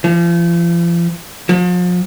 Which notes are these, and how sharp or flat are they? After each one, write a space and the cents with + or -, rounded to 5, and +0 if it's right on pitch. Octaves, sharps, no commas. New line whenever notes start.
F3 -40
F3 +40